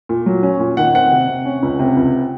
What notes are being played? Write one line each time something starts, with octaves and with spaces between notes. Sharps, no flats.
A#2
F#3
C#4
A#2
D#3 F#5
C4 F#5
C3
C3
C#4
C#2
C3
C#2